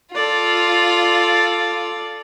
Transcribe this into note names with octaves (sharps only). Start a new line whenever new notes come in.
F4 A4 D5